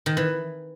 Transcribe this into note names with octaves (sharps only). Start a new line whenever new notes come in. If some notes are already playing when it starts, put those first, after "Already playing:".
D#3
E3